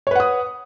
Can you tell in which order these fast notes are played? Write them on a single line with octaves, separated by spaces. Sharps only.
C#5 B4 F#5 D#6